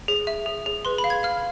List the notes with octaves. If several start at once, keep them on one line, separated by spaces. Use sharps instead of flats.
G#4
E5
G#4
G#4
B4 C6
B5
F5
G#6
F5 F6